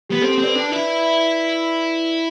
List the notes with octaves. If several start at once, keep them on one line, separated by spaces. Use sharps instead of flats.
B3 G4
C4 A4
C4
B4 D5
D4
B4 D5
E4